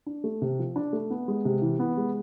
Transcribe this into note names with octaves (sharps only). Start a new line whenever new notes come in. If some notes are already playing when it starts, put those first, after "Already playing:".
D4
A3
C3
F3
D4
A3
B3
G#3
C3
E3
B3
G#3